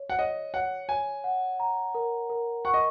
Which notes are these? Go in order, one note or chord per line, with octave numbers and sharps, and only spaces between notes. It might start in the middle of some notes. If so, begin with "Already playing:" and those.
Already playing: C#5
F#5
C#5 D#5
C#5 F#5
C#5 G#5
F#5
A#5
A#4
A#4
F#5 C#6
D#5